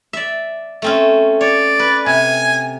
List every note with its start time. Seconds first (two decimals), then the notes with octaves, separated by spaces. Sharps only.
0.13 D5 E5
0.82 A3 C4 C#4
1.41 C#5 D5
1.79 B4
2.06 C3 G#5